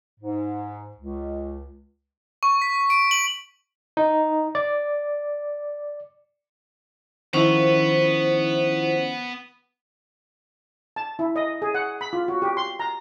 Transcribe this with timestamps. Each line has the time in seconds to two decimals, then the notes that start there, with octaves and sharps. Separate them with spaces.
0.20 G#2
0.96 C#2
2.43 C#6
2.62 B6
2.90 D7
3.11 F#7
3.97 D#4
4.55 D5
7.33 D#3 F3 B3 C#4 E4 C5
10.96 A5
11.19 E4
11.36 D#5
11.62 G#4
11.74 F#5
12.01 B5
12.13 F4
12.28 F#4
12.42 G4
12.57 C6
12.80 A#5